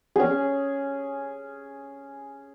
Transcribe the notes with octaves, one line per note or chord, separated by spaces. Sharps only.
C#4 G#4